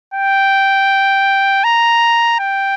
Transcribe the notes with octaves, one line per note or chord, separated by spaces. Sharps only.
G5
A#5
G5